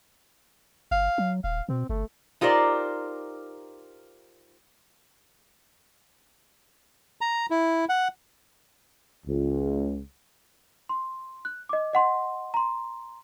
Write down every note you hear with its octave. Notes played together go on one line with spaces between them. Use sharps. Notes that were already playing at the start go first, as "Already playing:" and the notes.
G1 F5
F#3
D#1 F5
B2 C4
G1 A3
D#4 F4 G4 A#4 C5 D5
A#5
E4
F#5
C#2
C6
F#6
D#5 D6
D#5 F#5 C6
A#5 C6